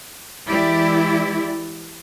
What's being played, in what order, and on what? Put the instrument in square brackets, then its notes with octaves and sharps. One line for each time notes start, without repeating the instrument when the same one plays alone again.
[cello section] E3 G#3 E4 G4 D5